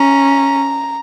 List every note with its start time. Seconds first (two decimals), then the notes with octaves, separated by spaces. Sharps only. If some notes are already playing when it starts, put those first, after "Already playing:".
Already playing: C#4 A#5